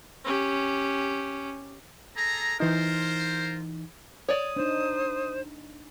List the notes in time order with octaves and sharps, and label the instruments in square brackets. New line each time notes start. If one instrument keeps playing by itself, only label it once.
[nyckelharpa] C#4 G4
[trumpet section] G#4 A4 A#5
[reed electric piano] E3 D#4 [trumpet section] F4 A#4 C5
[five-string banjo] C#5 D5 [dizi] D#6
[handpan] D4 D#4 [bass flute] C5